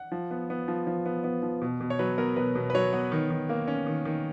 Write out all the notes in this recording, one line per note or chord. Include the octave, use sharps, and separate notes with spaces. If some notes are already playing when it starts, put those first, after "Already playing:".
Already playing: F#5
F3
B3
B3
F3
F3
B3
B3
F3
B2
B2
C#5
F#3 B4
B3 A#4
B2 B4
B2
B4
F#3 C#5
B3
D#3
D#3
A#3
C#4
D#3
D#3